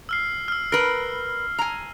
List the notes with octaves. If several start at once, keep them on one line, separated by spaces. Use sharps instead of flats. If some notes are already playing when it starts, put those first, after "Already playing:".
E6 F6 C7
E6 F6
A#4 B4 F6
G#5 A#5